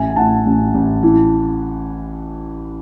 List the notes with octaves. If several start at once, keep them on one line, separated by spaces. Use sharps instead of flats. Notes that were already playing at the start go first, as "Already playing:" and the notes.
Already playing: A1 E5 G#5
G#5
A2 F#5 A5
A1
A1
E3